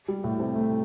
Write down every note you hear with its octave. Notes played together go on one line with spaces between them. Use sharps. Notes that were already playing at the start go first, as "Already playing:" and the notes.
G3
A2
C3
A3